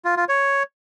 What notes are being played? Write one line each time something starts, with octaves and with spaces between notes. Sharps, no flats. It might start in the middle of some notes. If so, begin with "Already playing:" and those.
F4
F4
C#5